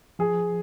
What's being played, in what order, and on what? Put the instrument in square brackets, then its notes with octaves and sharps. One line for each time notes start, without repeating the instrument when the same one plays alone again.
[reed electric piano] F3 [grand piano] G#4